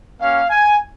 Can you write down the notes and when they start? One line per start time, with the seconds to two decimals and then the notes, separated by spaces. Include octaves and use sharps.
0.20 A#3 C#4 F#4 F5
0.50 G#5